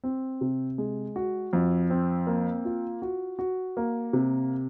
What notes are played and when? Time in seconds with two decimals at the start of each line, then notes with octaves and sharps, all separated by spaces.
0.04 C4
0.41 C3
0.78 G#3
1.16 F#4
1.53 F2
1.90 C4
2.27 A#3
2.65 F4
3.02 F#4
3.39 F#4
3.77 A#3
4.13 C3